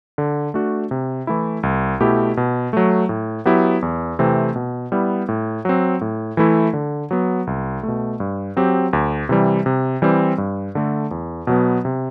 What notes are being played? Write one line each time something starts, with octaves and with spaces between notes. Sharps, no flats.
D3
A3 D4 F#4
C3
E3 A3 E4
C2
B2 A3 E4 G4
B2
F#3 A3
A2
F#3 B3 E4 G4
E2
C3 E3 A3 C4
B2
G3 B3 E4
A2
F#3 C4
A2
E3 A3 E4
D3
F#3 B3
C2
B2 A3
G2
F#3 C4 G4
D2
C3 E3 G3
C3
E3 G3 C4
G2
D3 A3
E2
B2 F#3 B3
C3